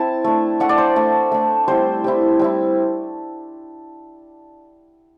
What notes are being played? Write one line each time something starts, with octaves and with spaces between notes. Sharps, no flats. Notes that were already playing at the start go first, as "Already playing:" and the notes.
Already playing: C4 E4 A5
A3 D4
A3 D4 F#5
D5
C5
A3 D4
A3 D4
G3 C4 E4 C5
G3 C4 E4
G3 C4 E4